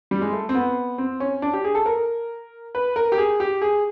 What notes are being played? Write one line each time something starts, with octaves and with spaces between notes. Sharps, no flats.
G3
G#3
A3
C4
B3
C4
C#4
D4
G4
G#4
A4
A#4
B4
A#4
G4
G#4
G4
G#4